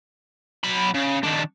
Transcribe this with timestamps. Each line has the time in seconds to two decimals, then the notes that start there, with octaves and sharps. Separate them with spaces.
0.64 F#3 B5
0.94 C#3
1.24 D#3 D4